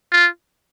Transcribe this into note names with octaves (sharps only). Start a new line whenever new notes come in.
F4